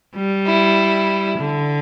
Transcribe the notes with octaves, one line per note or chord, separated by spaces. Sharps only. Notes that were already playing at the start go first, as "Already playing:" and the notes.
G3
E4
D3